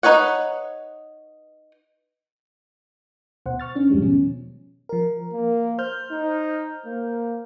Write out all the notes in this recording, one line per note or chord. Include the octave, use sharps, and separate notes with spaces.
D#4 B4 C#5 F#5
D2 B2 C5 F#5
C#6 F6 A6
C#4 D4
E2 G#2 F3 G3 G#3
B2 D#3 F3 C#4
F3 A#4
A#3
C5 F6 G6
D#4
A#3